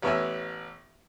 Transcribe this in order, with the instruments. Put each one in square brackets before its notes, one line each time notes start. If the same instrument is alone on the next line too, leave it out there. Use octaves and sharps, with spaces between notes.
[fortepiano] A1 B3 C#5 E5 G#5